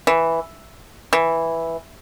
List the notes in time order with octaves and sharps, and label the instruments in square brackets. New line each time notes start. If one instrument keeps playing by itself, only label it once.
[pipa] E3
E3